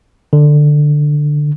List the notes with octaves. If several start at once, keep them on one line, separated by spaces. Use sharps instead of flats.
D3